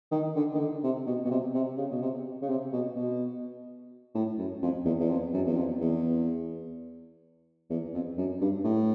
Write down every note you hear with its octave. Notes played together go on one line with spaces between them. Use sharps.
D#3
D3
D#3
D3
C3
B2
B2
C3
C3
C#3
B2
C3
C#3
C3
B2
B2
A2
F#2
F2
E2
E2
F2
F#2
E2
F2
E2
E2
F2
F#2
G2
A2